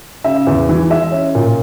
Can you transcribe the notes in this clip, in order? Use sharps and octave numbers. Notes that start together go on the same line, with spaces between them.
C#3 E5
E2
E3
G#3 E5
C#4
A#2